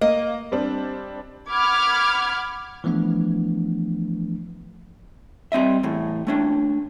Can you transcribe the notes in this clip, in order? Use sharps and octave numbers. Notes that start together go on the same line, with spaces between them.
A#3 D#5
G3 C4 D4
F#5 B5 D6 F6 G#6
E3 F3 A3 B3 D4
G3 C4 D#5 E5
E2 A2
A3 C#4 D4